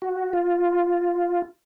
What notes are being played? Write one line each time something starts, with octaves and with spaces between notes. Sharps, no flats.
F#4
F4